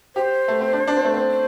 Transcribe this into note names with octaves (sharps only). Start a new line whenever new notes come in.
G4 C5
A3
C4
D4
D4
C4
A3
C4
C5